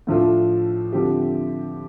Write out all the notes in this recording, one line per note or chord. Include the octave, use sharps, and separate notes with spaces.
A2 F3 D4 F4 A4
D3 F3 C4 G4